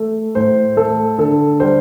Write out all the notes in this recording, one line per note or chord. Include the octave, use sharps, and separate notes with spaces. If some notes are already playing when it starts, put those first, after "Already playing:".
Already playing: A3 A4
A2 C5
A3 A4
D3 A4
G3 C5